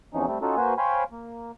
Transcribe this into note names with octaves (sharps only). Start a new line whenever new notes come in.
E2 C3 E3 F3 C#4 D#4
G3 A3 C4
C#4 D#4 F4 F#4 A4
A#3 F#4 B4 C5 G#5
C5 C#5 F5 G5 G#5 B5
A#3